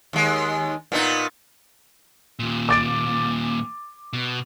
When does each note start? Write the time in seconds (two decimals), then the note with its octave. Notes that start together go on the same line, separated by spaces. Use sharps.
0.13 D#2 G#3
0.92 A#2 B3 D#4
2.39 D#2 A#2
2.69 D6 A6 D7
4.13 B2